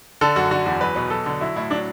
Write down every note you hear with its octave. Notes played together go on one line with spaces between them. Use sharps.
D3 A4
F#2 F#4
D3 F#4
E2 F#4
F#3 B4
B2 B4
F#3 A4
D3
F#3 E4
A2 E4
F#3 D4